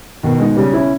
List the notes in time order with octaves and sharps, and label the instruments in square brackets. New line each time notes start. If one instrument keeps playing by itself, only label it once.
[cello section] B2 [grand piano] D#3
[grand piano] G#3 D#4
[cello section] C#3 [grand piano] G3
[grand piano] C#4 E4